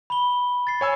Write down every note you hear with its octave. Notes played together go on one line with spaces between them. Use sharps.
B5 G7
A6 C7
C#5 G#5 E6